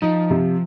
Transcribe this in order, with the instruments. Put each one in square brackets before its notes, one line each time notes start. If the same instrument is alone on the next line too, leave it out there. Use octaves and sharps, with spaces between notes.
[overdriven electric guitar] F3 [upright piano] D#4
[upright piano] C3